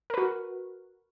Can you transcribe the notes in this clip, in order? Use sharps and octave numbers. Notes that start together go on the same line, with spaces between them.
F#4 A#4 B4